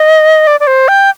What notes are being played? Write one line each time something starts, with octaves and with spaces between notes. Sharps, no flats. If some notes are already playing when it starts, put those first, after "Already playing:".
Already playing: D#5
D5
D5
C5
G5